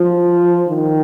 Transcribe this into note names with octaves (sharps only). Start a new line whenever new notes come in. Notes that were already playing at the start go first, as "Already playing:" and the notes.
Already playing: F3
D#3